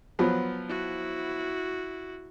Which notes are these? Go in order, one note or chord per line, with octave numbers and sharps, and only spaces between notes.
F3 F#3 B3
E4 F#4